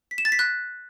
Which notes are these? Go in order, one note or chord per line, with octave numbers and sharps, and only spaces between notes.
B6
E7
A6
B6
F#6